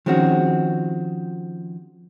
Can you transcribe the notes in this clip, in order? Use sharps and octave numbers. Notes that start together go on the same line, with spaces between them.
D#3 F3 G#3 C4 C#4 F#4